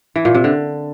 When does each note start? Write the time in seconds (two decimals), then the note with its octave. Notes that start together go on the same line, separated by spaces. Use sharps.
0.16 E3
0.25 A#2
0.35 C3
0.44 D3